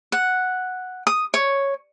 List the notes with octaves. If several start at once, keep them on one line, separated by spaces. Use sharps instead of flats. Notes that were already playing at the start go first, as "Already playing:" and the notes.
F#5
D#6
C#5